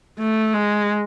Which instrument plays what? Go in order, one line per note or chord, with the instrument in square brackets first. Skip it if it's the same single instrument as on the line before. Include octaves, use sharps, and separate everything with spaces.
[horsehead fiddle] A3
G#3